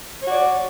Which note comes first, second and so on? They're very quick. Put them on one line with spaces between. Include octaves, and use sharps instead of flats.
C#5 F#4 D5